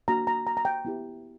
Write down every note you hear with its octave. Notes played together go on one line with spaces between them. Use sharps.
A#3 D4 F#4 A#5
A#5
A#5
A#5
G5
B3 E4 G4